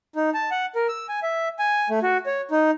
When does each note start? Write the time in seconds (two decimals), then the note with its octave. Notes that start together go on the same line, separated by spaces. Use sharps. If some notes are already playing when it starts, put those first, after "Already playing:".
0.16 D#4
0.34 A5
0.51 F#5
0.75 A#4
0.88 E6
1.09 G#5
1.23 E5
1.59 G#5
1.90 A3
2.03 F#4
2.26 C#5
2.51 D#4